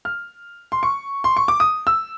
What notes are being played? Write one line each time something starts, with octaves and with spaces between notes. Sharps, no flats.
F6
C6
C#6
C6
C#6
D6
D#6
E6